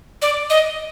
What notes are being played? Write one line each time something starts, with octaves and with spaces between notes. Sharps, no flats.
D5
D#5